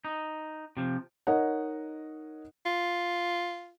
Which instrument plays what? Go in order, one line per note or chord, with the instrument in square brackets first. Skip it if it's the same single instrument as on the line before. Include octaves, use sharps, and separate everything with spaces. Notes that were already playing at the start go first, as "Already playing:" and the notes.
[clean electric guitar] D#4
C3 F3
[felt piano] D#4 A#4 C#5 D#5 F#5
[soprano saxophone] F4